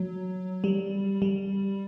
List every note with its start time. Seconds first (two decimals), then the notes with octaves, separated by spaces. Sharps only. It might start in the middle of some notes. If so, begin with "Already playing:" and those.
Already playing: F#3
0.64 G3
1.22 G3